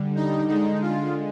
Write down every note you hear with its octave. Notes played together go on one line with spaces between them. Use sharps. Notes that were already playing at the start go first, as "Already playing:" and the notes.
Already playing: D3 G3
D#4
D3 G#3 D#4
F4